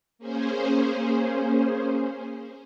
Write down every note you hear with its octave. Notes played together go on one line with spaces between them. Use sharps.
A#3 C#4 G#4 C5